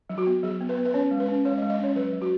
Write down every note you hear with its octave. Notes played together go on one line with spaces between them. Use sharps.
F#3
F#4
B3
F#3 G#4
B3
B4
B3
B4
C#4 C#5
G#3
B4
C#4
G#3 C#5
D#5
G#3
D#5
C#4 C#5
F#3 B4
F#3
F#4